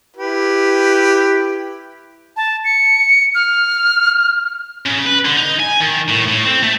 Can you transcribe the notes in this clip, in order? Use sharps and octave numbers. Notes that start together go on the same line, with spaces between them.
E4 G4 B4
A5
C#7
F6
C#3
B4
D3
D#4
G#5
D#3
A2
A2
C4
A3